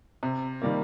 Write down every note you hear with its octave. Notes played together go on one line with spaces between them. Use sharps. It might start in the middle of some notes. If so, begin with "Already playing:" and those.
C3
D#3 G3 A#3